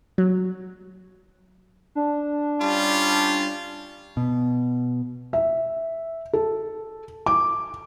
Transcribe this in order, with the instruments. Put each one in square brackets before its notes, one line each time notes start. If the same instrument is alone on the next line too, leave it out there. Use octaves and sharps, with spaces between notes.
[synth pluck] F#3
[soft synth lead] D4
[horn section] G3 C#4 F4
[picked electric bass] B2
[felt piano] E5
A4
D6